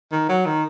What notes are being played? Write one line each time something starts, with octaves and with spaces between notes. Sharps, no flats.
D#3
F#3
D#3